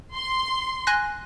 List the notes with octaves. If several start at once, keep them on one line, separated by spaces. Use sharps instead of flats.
C6
G#5 F#6 A#6